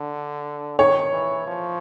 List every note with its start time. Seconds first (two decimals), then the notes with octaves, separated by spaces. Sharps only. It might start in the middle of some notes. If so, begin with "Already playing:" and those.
Already playing: D3
0.79 D#3 C#5
1.12 E3
1.47 F3